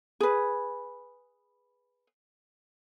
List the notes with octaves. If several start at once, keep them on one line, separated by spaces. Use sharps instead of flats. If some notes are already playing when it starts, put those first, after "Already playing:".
G#4 B4